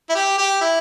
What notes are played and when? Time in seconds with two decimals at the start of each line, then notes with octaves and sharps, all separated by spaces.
0.10 E4
0.15 G4
0.38 G4
0.61 E4